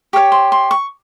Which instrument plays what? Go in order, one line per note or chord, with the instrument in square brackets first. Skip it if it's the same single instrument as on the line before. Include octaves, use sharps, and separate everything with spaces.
[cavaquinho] G4 A#4 C#5 C#6
C6
C6
C#6